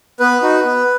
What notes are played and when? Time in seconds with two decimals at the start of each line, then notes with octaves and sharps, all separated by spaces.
0.20 B3 B4
0.42 D#4 F#4
0.65 B3